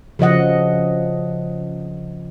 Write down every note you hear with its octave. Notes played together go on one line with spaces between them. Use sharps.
C#3 F3 D#5 F#5